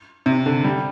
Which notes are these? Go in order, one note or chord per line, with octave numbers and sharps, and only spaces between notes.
C3
D3
G3